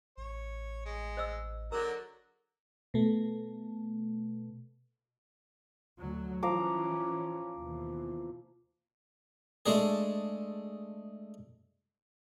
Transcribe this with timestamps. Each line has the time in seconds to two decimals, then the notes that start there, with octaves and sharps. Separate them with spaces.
0.17 A1 C#5
0.85 G#3
1.17 C5 D#5 E6
1.72 D3 F#3 G#4 A#4 A#5
2.94 B2 A3
5.99 D2 F#3
6.43 E3 F3 C#4 A#5 D6
7.55 D#2 B2 E3
9.66 G#3 A3 D4 G#4